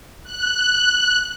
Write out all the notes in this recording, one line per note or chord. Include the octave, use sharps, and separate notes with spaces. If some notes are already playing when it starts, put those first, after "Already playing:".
F#6